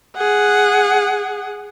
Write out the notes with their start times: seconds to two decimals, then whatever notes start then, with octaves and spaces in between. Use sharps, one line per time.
0.17 G#4 F#5